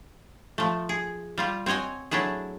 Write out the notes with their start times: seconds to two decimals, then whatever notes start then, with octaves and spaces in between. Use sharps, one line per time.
0.58 F3 A3
0.89 G#4
1.38 G3 F4 G4
1.66 C4 F#4 C#5 D#5 G#5
2.11 F#3 A3 D4 E4 G#4